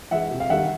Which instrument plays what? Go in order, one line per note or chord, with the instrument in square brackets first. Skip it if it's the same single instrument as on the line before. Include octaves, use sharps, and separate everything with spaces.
[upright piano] E3 G#3 E5 F#5
C3
F5
D#3 G3 E5 F#5